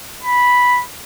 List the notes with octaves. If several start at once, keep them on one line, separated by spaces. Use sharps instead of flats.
B5